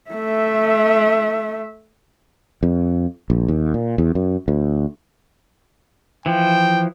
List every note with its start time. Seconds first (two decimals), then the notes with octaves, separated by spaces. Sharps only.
0.10 A3 E5
2.63 F2
3.30 A#1
3.48 D#2
3.74 A#2
3.98 E2
4.15 F#2
4.48 D2
6.26 E3 F3 G5